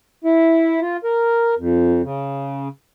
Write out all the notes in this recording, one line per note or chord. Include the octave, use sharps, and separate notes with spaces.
E4
F4
A#4
F2
C#3